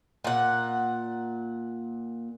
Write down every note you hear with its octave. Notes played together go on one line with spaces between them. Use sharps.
A#2 F#5